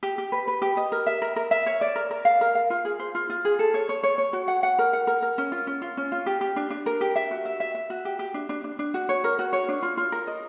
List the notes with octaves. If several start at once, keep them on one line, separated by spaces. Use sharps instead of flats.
G4
G4
B4
B4
G4
D#5
A#4
E5
A#4
A#4
E5
C#5
D5
A#4
A#4
F5
A#4
F5
F4
G#4
C5
F4
F4
G#4
A4
C#5
C#5
C#5
C#5
F#4
F#5
F#5
A#4
F#5
A#4
A#4
C#4
F4
C#4
F4
C#4
F4
G4
G4
D4
D4
A#4
G4
E5
F#4
E5
E5
E5
F#4
G4
G4
D4
D4
D4
D4
F#4
C#5
A#4
F#4
C#5
D4
F4
F4
A#4
D#5